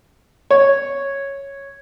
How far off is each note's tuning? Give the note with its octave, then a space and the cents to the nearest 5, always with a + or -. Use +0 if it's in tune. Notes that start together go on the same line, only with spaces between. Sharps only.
C#5 -5